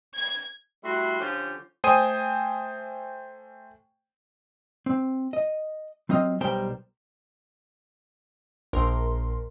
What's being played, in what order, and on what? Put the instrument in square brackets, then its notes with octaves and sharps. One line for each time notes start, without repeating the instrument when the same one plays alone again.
[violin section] G#6
[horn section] G3 A3 E4 F#4 C6
D3 F3 C#4 F4 G4
[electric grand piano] A3 C5 G5 G#5 D#6 D#7
[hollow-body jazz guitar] C4
D#5
F#3 C4 F4 D#5 F5
B1 G3 B3 A#4 C5 G5
[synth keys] A#1 A#4 C6